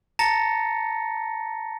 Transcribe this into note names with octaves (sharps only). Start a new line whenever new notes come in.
A5 A#5 A6 A#6 C#7